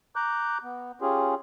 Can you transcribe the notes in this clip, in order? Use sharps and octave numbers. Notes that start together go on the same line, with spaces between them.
A#5 D6 F#6 G6
B3
C#4 F4 G4 G#4